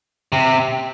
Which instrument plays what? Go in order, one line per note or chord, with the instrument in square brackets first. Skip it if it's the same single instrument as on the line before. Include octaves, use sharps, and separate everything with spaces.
[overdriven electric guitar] C3